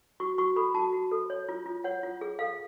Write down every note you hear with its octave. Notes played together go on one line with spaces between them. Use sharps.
F#4 C#6
F#4 C#6
A4 B5
F#4 A5
F#4
A4
C#5
F4
F4
C#5 F#5
F4
G#4
A4 F5